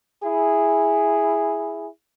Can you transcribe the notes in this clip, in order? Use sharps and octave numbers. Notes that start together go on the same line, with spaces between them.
E4 G#4